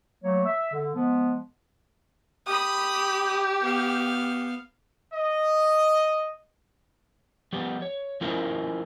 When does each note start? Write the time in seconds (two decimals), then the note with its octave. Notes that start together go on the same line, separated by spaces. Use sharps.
0.23 F#3 A3 A#3 C#5
0.45 E5
0.72 D3
0.95 F3 G#3 B3
2.47 G4 B5 D#6
3.61 B3 F5
5.13 D#5
7.53 F3 G3 B3 G4
7.82 C#5
8.21 F3 C#4 E4 F4 A#4 C5